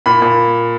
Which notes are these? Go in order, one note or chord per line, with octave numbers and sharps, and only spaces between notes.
A#2 B5
A#2